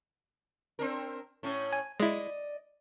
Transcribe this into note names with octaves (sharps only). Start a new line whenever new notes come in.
C4 D4 A#4
A2 C#4
G#5
G#3 E4 D5 D#5